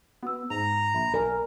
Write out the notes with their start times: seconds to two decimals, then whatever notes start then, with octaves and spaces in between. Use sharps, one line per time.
0.23 B3 F#4 E6
0.50 G#2 A#5 F7
0.94 A#1 E5 B5
1.14 B1 A#4 D5 G#5 A#5